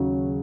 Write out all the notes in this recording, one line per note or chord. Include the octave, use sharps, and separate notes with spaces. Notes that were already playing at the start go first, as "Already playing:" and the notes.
Already playing: D#2 C#3 F#3